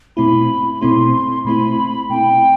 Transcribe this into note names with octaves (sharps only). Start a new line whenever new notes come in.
B2 A3 C4 E4 B5
B5
B2 A3 C4 E4 C6
B2 A3 C4 E4 B5
B2 A3 C4 E4 G5